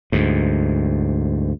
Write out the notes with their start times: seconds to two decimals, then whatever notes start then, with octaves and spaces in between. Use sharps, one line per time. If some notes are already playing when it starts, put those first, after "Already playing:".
0.12 D2 G#2